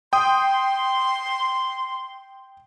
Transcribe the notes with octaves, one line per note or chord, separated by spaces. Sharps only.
G5 C6 D#6